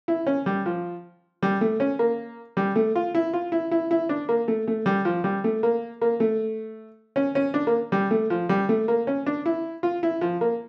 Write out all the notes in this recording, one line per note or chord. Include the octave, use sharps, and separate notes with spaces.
E4
C#4
G3
F3
G3
A3
C#4
A#3
G3
A3
F4
E4
F4
E4
E4
E4
D4
A#3
A3
A3
G3
F3
G3
A3
A#3
A#3
A3
C#4
C#4
D4
A#3
G3
A3
F3
G3
A3
A#3
C#4
D4
E4
F4
E4
F3
A#3